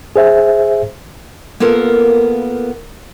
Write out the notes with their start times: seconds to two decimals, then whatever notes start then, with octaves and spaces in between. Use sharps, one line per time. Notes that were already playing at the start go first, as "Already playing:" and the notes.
0.16 G#4 C5 E5
1.60 A#3 B3 F4 A4 A#4